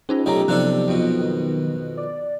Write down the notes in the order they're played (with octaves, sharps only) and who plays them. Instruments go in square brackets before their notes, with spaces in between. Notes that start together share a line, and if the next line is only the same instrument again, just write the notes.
[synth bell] C#4 D#4 F4 [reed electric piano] G#4 C5
[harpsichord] B1 C#3 A3 [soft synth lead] G4 [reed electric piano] D#5 A#5
[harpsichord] C3 D4 A4 [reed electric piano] F3 F#3 D#4 [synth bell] B3 F#6
[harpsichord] F2 B2
[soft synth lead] D#3
D5